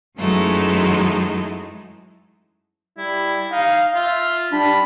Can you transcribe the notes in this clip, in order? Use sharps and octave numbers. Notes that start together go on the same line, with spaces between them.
F#2 E3 F#3 G#3 A3 D#4
G3 E4
D#4 F5
F4 E5
G3 D4 B5